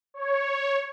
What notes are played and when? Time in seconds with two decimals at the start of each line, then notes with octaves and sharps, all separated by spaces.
0.14 C#5